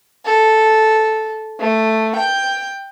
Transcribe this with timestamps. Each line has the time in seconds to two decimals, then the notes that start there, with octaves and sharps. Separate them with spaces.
0.25 A4
1.59 A3
2.15 G5